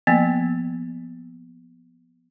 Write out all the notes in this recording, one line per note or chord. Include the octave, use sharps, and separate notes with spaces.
F3 A#3 B3